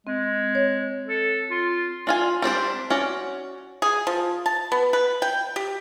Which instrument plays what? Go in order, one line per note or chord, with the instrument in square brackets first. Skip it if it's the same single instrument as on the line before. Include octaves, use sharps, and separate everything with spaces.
[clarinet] G#3 [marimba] C4
[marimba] C#5
[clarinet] A4
F4
[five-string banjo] D4 F4 G#5
G3 C4 D4 C5
C#4 F#4 D5
[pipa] G#4
F3
A5
B3
B4
G5
G4